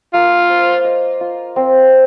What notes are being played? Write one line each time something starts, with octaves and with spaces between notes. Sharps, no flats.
A#3 F4
C5
D#5
F4
C4